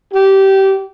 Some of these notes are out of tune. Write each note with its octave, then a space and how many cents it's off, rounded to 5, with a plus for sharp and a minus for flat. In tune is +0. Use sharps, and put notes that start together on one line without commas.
G4 -20